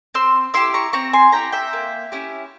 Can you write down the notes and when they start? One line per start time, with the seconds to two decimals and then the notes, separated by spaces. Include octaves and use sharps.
0.14 C4 C6 E6
0.54 E4 G4 C6 E6
0.74 A#5 C#6
0.93 C4 A#5 C#6
1.13 G#5 C6
1.32 E4 G4 G5 A#5
1.52 E5 G5
1.73 A#3
2.12 C#4 E4 G4